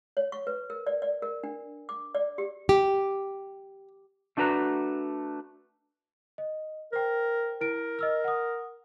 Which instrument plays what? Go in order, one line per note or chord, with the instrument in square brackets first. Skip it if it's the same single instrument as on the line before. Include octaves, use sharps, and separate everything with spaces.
[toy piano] C#5
C#6
B4
A#4
D5
D5
A#4
D4
D6
D5
G4
[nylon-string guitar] G4
[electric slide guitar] A3 D4 F#4 B4 A#5
[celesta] D#5
[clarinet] A#4 [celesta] C5 G5
[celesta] E4 D7 [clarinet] A#4
[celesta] D#5 E6 F6
F#5 D#6